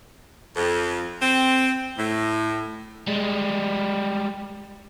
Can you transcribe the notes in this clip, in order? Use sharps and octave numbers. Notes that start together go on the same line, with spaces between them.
F2
C4
A2
G3 G#3